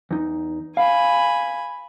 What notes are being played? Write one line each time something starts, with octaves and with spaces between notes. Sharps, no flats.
E2 D#4
F5 G#5 B5